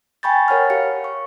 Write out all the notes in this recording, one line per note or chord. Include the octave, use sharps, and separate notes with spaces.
G5 G#5 B5 C#6 G6 A6
A#4 C#5 F#5 F6
G4 F5 C#7
C#6